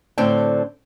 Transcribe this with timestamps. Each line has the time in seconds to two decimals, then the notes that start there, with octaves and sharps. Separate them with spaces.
0.18 A2 D3 C4 D4 D5 G5